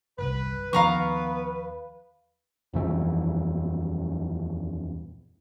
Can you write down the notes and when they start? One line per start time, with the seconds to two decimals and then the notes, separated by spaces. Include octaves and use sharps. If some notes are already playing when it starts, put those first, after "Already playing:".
0.18 G1 C2 B4
0.73 D#2 D#3 F3 B3 B4 F5 A#5 C#6
2.73 D#1 F2 E3